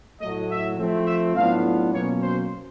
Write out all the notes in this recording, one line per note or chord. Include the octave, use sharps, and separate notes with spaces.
A2 F#3 A3 D#5
E5
F3 A3 C4
E5
A2 F#3 B3 D4 F4 F5
B2 F#3 A#3 C#4 C#5
C5